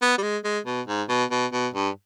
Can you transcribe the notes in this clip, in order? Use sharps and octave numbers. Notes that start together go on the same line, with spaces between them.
B3
G3
G#3
G#3
B2
G#2
B2
B2
B2
G2